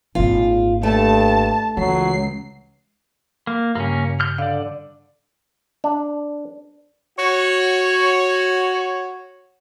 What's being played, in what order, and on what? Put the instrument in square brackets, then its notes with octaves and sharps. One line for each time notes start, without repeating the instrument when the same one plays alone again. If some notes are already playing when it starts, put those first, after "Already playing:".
[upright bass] G#1 A#2 [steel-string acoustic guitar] F4
[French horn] G2 [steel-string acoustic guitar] A3 [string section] A5
[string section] C#2 C7 [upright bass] E3 [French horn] F#3
[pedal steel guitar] A#3
[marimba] G2 C#3 G3 [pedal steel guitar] A#3 C#4
[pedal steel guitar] F6 G6
[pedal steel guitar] D3 D5 [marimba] F5
[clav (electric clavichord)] D4
[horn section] F#4 C#5